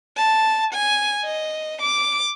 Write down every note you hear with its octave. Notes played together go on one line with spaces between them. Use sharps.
A5
G#5
D#5
D6